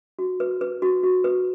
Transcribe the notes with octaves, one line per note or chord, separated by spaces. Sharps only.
F#4
B4
B4
F#4
F#4
B4